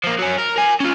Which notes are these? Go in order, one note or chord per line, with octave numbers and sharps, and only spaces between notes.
F3 A#3
F#3 C#4
A#4
A#4 G#5
C#4 F4